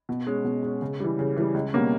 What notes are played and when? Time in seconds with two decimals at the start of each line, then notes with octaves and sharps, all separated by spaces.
0.09 B2
0.27 G#3 C#4
0.44 B2
0.63 G#3 C#4
0.82 C#3
1.00 E3 G3
1.19 C#3
1.37 E3 G3
1.54 C#2
1.73 B2 G3 A#3 C#4